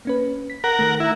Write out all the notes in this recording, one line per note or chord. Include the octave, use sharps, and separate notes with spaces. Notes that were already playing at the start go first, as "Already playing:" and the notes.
A#3 C#4 B4
B6
A#4 F#5
D#3 A3
E4